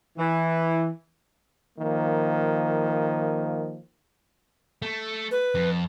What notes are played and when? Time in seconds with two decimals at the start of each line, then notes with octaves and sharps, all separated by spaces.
0.17 E3
1.79 D#3 F3 A#3
4.82 A3
5.31 B4
5.55 F2